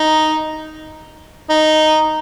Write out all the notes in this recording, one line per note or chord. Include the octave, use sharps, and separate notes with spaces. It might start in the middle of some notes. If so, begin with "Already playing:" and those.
Already playing: D#4
D#4